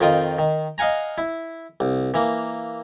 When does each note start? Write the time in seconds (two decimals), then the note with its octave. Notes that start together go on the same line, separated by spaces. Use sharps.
0.01 F2 D#3 F4 G5 D#6
0.39 D#3
0.78 D#5 F5 F#5 G#5 A#5
1.18 E4
1.80 C2
2.14 E3 A#3